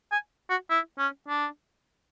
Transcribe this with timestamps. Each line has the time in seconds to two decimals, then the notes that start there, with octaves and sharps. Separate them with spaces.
0.12 G#5
0.50 F#4
0.70 E4
0.99 C#4
1.29 D4